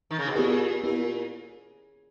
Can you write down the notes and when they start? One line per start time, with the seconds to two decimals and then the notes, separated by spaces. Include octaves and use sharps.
0.11 D#3
0.19 C#3
0.27 B2
0.35 A#2 B3 E4 G4 A#4
0.84 B3 E4 G4 A#4